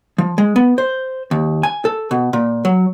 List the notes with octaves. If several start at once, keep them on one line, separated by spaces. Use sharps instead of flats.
F3
G#3
B3
C5
D#2
G#5
A4
B2
A#2
F#3